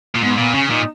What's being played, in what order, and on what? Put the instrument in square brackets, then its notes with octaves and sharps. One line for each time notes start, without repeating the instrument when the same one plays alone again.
[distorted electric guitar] A#2
[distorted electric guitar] G#2 [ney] B3
[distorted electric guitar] A#2 [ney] B3
[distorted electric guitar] C#3 [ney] C#4
[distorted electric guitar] A#2 [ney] D#4